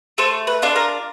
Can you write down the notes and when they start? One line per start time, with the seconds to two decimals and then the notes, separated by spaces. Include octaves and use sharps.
0.18 A3 C5
0.47 B4
0.62 D4 F4 A4
0.76 A#4